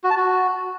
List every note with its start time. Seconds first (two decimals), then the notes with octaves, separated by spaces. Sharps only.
0.04 F#4
0.10 A5
0.17 F#4